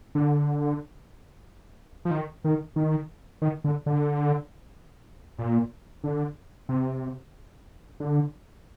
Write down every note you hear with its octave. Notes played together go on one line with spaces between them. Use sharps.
D3
F3
D#3
D#3
D#3
D#3
D3
D3
A#2
D3
C3
D3